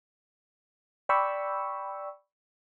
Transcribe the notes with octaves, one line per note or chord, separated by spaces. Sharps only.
D5 G5 B5 C#6 E6